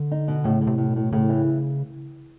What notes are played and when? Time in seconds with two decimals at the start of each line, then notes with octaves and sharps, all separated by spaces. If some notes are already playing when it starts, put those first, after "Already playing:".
Already playing: D3
0.11 D#4
0.28 B2
0.44 A2 C#3
0.61 A2
0.67 C3
0.78 A2
0.90 B2
0.96 A2
1.12 A2 C#3
1.29 E3